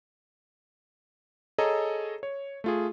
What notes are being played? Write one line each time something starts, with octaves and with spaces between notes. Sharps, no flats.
G#4 A4 C#5 D#5 A#5
C#5
A3 F4 G#4